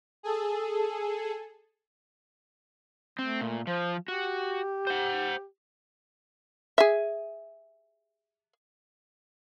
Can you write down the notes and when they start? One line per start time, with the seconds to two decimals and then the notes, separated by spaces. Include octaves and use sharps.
0.23 G#4 A4
3.19 A3 C4
3.41 A#2
3.67 F3 C5
4.08 F#4 G4
4.87 C5 F#5
6.78 G#4 E5